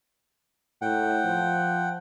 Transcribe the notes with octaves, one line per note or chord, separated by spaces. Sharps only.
A2 F#5 G5
F3